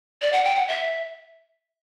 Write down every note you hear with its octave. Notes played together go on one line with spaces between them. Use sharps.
D5
F#5
G5
F#5
E5